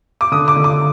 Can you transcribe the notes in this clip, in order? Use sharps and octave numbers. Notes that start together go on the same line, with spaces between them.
D6
D3 D#6
D6
D3
D6